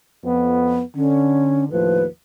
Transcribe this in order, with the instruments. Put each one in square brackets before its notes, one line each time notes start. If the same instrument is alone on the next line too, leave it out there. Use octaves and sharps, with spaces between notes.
[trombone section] F2 B3
[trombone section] D3 [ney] C#4
[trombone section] D#2 A2 F3 [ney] B4